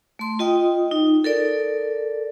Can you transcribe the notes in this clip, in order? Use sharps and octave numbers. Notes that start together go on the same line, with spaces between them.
A3 C6
F4 D#5 G5 D#6
D#4
A4 A#4 D5